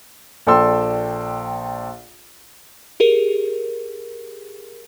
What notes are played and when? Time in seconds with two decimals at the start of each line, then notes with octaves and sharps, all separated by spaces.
0.47 A#1 A4 D5 G5 C6 E6
3.00 G4 G#4 A#4